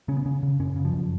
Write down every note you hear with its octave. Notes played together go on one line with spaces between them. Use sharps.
C#3 C#4
B3
C#3 C#4
C#3
F#2 C#4
C#3
F3
F#2